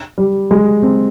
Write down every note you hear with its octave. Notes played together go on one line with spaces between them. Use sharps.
G3
G#3
C4